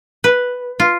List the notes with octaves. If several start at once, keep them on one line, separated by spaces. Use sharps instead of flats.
B4
F4